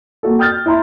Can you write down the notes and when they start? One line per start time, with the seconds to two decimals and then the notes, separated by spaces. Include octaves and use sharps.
0.23 A#3 F#4 A4
0.39 G5 D#6 F6 G6 A6
0.66 E4 E5 A#5 C6